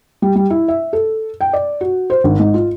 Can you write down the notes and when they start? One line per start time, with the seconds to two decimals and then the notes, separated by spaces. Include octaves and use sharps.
0.22 G3
0.36 G3
0.50 E4
0.68 E5
0.93 A4
1.41 G5
1.53 D5
1.81 F#4
2.10 C5
2.24 G#1
2.39 G#2
2.54 F4